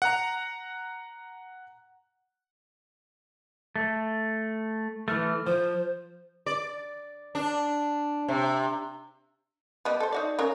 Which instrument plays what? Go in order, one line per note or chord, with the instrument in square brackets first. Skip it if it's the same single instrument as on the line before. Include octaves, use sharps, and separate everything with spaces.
[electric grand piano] F#5 A#5
[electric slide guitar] A3
[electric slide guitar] E3 A3 [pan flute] F6
[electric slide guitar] F3 [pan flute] C5
[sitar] D5
D4
C3
[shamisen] G3 B3 D#5
A4 C5
D#4 F#4 D5
C#3 A#4 C#5